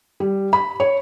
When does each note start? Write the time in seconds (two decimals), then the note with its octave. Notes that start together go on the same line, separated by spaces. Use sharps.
0.20 G3
0.53 B5
0.80 C#5